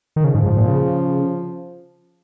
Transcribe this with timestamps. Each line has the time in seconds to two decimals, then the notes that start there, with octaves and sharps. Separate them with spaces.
0.16 D#3
0.24 C#3 F3
0.35 G#2
0.46 G#2
0.57 A#2
0.68 C#3